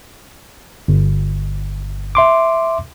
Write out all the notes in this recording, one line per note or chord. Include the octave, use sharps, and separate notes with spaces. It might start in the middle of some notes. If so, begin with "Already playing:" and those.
G1
E5 C6 D6